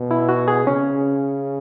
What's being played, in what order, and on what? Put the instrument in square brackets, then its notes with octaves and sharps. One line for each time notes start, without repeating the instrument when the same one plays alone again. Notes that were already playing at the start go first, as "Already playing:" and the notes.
Already playing: [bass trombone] B2
[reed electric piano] E4
F#4
G#4
[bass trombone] C#3 [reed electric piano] C#4